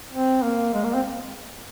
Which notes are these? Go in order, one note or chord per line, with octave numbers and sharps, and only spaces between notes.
C4
A#3
G#3
A#3
C4